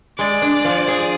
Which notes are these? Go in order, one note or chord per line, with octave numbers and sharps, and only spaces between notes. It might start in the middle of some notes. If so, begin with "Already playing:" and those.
G#3 D5
D4
F3
G#4